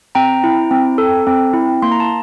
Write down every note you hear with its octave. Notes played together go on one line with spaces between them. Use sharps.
C4 G5 A#5
E4
C4
A4
C4
E4
A#3 C6
A#5
A5